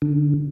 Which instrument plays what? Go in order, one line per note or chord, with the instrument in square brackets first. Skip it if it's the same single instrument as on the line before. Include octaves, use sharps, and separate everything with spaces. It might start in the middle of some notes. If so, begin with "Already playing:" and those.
[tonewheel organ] D3